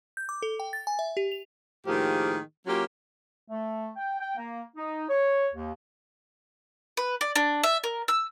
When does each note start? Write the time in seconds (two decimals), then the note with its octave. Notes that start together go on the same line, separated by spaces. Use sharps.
0.17 G6
0.29 D6
0.42 A4
0.60 G5
0.73 A6
0.87 G#5
0.99 E5
1.17 G4
1.32 F7
1.87 A2 D#3 F3 A#3 G4 G#4
2.66 F#3 A#3 C#4 F4 G4
3.48 A3
3.96 G5
4.19 G5
4.36 A#3
4.76 D#4
5.08 C#5
5.53 D#2
6.97 B4
7.21 D5
7.36 D4
7.64 E5
7.84 A#4
8.08 E6